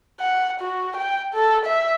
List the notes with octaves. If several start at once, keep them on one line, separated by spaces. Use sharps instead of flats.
F#5
F#4
G5
A4
E5